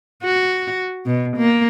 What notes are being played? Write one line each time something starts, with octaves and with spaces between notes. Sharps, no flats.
F#4
B2
A#3